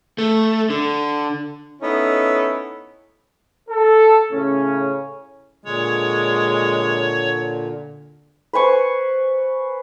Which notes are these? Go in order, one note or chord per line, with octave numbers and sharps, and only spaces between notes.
A3
D3
B3 C#4 D#4 E4 A4
A4
A2 C#3 C#4
A#2 D3 G#3 C#5
B4 C5 G#5 C#6